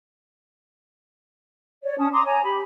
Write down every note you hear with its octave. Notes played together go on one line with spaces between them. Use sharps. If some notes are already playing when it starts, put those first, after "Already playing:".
C#5 D5
C#4 A5 D#6
A#5 C6 D6 D#6
C#5 G#5 A#5
G4 B5